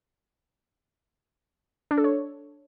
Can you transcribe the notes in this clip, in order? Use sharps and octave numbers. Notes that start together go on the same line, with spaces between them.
D4
A4
C#5